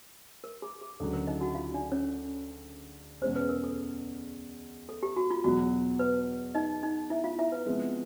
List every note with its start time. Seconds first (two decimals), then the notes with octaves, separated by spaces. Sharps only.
0.44 A#4
0.62 G#4
0.81 G#4
1.00 D2 C#3 F#3 A4
1.13 A#4
1.27 D#4 D#5
1.41 F#4 F#5
1.55 F4 F5
1.74 D4 D5
1.92 C#4 C#5
3.22 E2 B2 G#3 C#4 C5
3.36 B4
3.49 A#4
3.64 A4
4.89 A4
5.03 G4
5.17 F#4
5.30 F4
5.44 E2 B2 F#3 F#4
5.99 B4
6.55 D#4 D#5
6.83 D#4 D#5
7.10 E4 E5
7.24 F4 F5
7.39 E4 E5
7.52 B4
7.66 C3 F3 G#3 B3